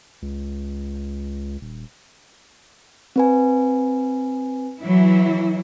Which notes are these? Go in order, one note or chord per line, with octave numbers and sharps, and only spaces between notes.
C#2
D#1
C4 B4 G#5
E3 F#3 E4